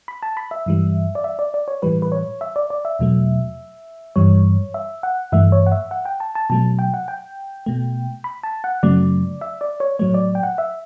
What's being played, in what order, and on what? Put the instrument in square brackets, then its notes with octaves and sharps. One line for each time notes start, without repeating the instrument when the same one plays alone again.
[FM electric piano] B5
A5
B5
E5
G2 E3 G3
D5
E5
D5
D5
C#5
A2 E3 G3 B4
B4
C#5
E5
D5
D5
E5
E2 B2 F#3 A3
G2 E3 G3 C#5
E5
F#5
G2 E3 A3 E5
C#5
F#5
E5
F#5
G5
A5
A5
B2 F#3 A3 A5
G5
F#5
G5
B2 A3
B5
A5
F#5
F#2 C#3 F#3 A3 D5
E5
D5
C#5
A2 F#3 A3 C#5
D5
G5
F#5
E5